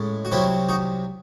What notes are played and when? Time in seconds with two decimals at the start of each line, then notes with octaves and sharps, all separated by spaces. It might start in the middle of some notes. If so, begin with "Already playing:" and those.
Already playing: A2 G#3 C#4
0.25 F#4
0.32 C2 C3 F#3 C4 C#4 E4
0.69 D#4 F#4